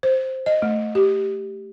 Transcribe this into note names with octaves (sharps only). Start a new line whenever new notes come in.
C5
D#5
A3
G4